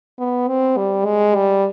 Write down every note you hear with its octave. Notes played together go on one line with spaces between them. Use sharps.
B3
C4
G3
G#3
G3